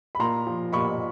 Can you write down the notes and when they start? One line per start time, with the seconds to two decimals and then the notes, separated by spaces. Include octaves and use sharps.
0.15 B5
0.19 A#2 A#5 C6
0.47 F3
0.73 A#2 B5 C#6